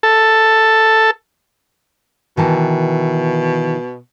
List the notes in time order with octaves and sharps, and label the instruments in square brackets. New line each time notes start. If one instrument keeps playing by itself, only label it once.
[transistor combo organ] A4
[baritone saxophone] B2 [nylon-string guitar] D#3 E3 A5